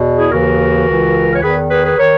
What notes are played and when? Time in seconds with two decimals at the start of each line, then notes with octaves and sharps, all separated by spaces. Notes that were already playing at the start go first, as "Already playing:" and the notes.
Already playing: E2 B2
0.17 E4 G#4
0.30 D#2 C#3 E3 F#4 A#4
0.87 C#2 C#3 E3
1.34 C#5
1.42 E2 D#3 G#4 B4
1.70 G#4 B4
1.84 G#4 B4
1.97 D#3 A#4 C#5